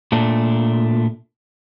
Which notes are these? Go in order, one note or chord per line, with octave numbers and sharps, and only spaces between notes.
A#2 A3 D4